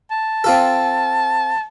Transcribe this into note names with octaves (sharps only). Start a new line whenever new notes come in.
A5
C4 F4 A4